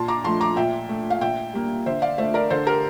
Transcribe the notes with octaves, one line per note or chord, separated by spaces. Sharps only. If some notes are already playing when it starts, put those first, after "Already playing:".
Already playing: A#2 A5 C6
A#5 D6
F3 A3 A5 C6
A#5 D6
A#2 E5 G5
A3
F5
A#2 E5 G5
G3 A#3
D3 C5 E5
D5 F5
A3 C5 E5
A#4 D5
D3 A4 C5
G4 A#4